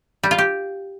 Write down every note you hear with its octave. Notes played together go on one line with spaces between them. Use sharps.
G3
F4
G4